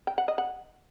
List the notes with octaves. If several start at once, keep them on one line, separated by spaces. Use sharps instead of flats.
G5
F#5
D#5
F#5